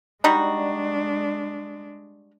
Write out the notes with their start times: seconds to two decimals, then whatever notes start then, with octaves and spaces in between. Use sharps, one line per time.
0.24 G3 G#3 D4 D#4 F#4